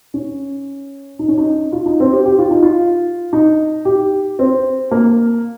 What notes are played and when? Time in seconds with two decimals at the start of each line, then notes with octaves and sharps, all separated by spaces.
0.14 C#4
1.19 D#4
1.28 C#4
1.38 D#4
1.72 F4
1.86 D#4
2.00 C4
2.12 G4
2.25 G4
2.39 F4
2.51 D#4
2.63 F4
3.33 D#4
3.85 G4
4.39 C4
4.91 A#3